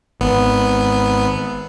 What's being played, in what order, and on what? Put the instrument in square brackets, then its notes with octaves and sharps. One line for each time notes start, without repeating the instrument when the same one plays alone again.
[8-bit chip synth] G#1 B3